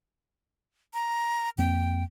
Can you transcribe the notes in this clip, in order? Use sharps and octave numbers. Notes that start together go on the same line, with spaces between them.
A#5
F2 A#3 C4 G5